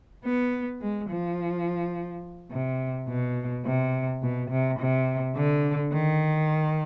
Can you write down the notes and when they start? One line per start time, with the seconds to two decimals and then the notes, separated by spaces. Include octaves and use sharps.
0.25 B3
0.81 G#3
1.10 F3
2.51 C3
3.08 B2
3.65 C3
4.22 B2
4.51 C3
4.80 C3
5.36 D3
5.93 D#3